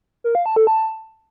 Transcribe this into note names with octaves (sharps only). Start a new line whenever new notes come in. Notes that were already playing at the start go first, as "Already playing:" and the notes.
A#4
F5
A5
A4
A5